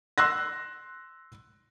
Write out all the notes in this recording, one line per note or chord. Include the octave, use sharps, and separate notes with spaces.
C6 E6 F#6 A#6